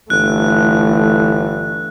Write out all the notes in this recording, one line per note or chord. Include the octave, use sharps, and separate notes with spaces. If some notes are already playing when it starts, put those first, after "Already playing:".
G1 E3 A3 F#6